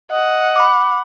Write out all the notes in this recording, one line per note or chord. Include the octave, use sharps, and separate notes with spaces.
D#5 F#5
B5 D6